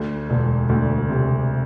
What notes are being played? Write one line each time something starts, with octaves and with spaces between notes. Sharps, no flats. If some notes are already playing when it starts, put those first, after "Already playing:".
Already playing: D2
E1
D2
C3